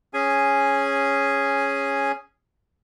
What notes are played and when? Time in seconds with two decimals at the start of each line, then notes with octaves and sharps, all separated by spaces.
0.14 C#4 G#4 G#5